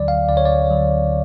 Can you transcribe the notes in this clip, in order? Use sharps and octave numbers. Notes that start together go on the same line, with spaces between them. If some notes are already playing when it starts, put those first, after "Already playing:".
Already playing: D2 D3 F#3 D5
F5
D2 D3 F#3 D5
C#5
D5
D2 D3 F#3